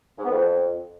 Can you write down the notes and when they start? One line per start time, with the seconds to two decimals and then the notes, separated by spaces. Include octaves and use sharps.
0.18 G#2
0.25 B3
0.31 F2